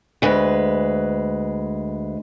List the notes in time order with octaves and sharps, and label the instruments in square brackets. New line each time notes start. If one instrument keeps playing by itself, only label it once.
[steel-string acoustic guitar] D2 G#3 B4